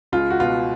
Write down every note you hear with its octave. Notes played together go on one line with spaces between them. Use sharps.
C#2 F4
F#4
B2 F4